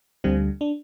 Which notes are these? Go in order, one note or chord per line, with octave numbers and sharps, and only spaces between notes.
D2 D3 G3 C4
D4